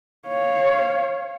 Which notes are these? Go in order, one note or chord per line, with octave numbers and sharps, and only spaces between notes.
C#5 F5